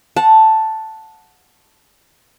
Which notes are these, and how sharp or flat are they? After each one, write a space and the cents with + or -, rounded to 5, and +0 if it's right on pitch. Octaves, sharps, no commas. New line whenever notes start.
F#5 -20 A5 +0